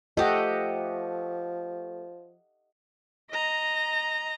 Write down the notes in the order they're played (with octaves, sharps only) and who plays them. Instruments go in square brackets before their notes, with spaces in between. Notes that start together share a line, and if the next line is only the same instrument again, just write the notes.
[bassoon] F3 [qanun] A3 G4 [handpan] D#5 F#5
[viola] D#5 A#5